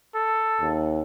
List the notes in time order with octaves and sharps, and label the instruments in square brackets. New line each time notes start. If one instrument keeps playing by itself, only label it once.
[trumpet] A4
[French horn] D#2